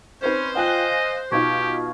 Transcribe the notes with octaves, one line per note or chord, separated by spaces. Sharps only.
C4 C#4 D#4 B4 C5
F4 D#5 F5 G5 G#5 F#6 G7
A#6
B2 D#4 F4 G4 C#6 G#6